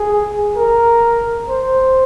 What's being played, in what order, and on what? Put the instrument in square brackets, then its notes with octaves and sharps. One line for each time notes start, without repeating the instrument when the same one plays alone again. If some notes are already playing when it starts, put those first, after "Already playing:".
Already playing: [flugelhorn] G#4
A#4
C5